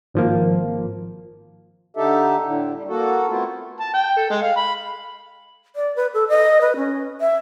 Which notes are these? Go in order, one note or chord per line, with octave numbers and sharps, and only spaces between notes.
G#1 F3 A#3
D3 D#4 G4 A4 E5
A2 D3
G3
A#3 F#4 A4
A3 B3 C4 E4 F4
A5
G5
A4
G#3
F5
B5
D5
B4
A4
D#5
B4
C#4
E5